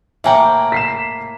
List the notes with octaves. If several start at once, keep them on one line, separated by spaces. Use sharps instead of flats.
A2 A#3 E5 F#5 G5
B6 C7 E7